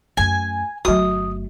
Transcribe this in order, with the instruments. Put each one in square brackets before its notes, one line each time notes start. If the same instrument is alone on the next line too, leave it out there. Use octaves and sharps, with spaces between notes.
[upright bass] F#2 A3 [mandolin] G#5
[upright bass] G1 A3 [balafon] F#3 F#4 [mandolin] D#6